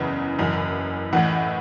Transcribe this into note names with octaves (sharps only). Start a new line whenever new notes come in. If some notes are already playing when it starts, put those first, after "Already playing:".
Already playing: F#1 E2 C#3 E3 B4
F#1 F#2 E3
A1 A2 E3 F#5